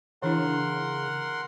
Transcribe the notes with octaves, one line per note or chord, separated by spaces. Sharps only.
C#3 E3 D4 E4 A#4 F#5 C6